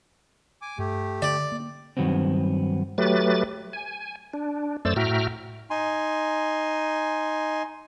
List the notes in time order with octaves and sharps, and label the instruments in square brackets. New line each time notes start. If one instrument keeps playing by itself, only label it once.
[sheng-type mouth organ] G#5 D6
[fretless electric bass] G2 [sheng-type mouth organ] A3 G4
[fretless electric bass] D3 [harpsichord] D5
[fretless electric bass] A#3
[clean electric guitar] G2 C3 D#3 F#3 B3 C4
[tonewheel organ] F#3 A3 G4 B4 A6
G#5
D4
F#2 A3 C5 D5 E6 A6
A2 F#4 E5 G5 A#5 F6
[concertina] D#4 G#5 C6